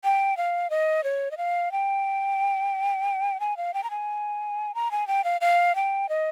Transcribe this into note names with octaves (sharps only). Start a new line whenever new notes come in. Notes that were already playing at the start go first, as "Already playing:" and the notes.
G5
F5
D#5
C#5
D#5
F5
G5
G#5
F5
G5
A#5
G#5
A#5
G#5
G5
F5
F5
G5
D#5